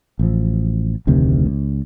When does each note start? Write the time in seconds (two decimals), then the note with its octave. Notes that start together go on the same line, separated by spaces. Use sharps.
0.19 A1 F3
1.07 F1 D2 C3 D#3
1.46 C#2